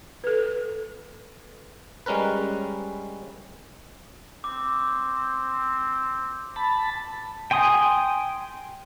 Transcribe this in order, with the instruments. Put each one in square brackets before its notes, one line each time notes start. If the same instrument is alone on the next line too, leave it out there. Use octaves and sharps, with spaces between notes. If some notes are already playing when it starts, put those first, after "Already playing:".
[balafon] A4 B4
[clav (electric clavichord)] G3 G#3 C#4 A#4 B4
[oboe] C4 [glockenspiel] D6
[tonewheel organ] A5 B5
[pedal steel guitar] G5 G#5 C6 D#6